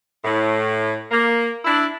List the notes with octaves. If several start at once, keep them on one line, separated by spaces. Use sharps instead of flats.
A2
A#3
D4 E4